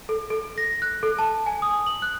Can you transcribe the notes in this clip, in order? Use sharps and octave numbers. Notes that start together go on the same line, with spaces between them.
A4
A4
A#6
F#6
A4
A5
G#5
D#6
F#7
F#6